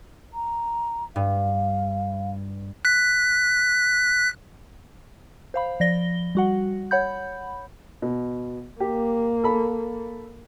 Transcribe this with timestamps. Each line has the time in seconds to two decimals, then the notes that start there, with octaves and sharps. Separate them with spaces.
0.34 A#5
1.16 G2 F5
2.85 F#6 B6
5.54 C5 F5 B5
5.80 F3 D5 A#6 G7
6.35 G3 F#4 F#5
6.91 C#5 F#5 B5 G6
8.02 B2
8.80 A#3 G4
9.44 A4 B5